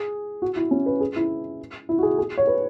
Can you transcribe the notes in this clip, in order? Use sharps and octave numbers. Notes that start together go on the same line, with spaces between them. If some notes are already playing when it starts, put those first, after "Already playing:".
Already playing: G#4
F#4
E4
C#4
B4
G#4
E4
E4
F#4
G#4
G#4
C#5
B4